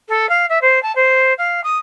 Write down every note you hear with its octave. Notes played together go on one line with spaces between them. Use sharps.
A4
F5
E5
C5
A5
C5
F5
D#6